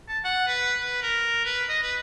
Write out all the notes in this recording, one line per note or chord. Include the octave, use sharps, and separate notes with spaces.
A5
F#5
B4
B4
A#4
B4
D#5
B4